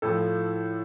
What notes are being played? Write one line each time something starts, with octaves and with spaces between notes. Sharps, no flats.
A2 F3 A4